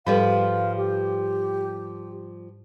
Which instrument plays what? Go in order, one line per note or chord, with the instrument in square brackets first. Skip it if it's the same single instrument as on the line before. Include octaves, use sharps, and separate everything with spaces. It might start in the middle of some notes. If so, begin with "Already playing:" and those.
[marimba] G#2 A4 [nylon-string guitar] F3 G3 B4 [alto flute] F5
[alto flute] G4